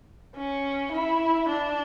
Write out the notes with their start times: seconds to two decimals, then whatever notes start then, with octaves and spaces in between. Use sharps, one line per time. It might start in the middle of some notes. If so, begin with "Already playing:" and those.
0.36 C#4
0.92 E4
1.49 D4